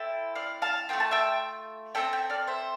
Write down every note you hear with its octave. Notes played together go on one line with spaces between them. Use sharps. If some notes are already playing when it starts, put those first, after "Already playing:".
Already playing: C4 E4 A4
D5 F5
F5 A5
A3 C4 F4 G5
A5
E5 G5
C4 F4 A4 E5 G5
E5 G5
D5 F5
C5 E5